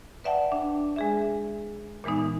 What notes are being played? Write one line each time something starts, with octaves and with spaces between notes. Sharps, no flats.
B4 D5 E5 F#5 G5 A5
D4
G#3 G#4 E5
A#2 E3 G#3 B3 D#4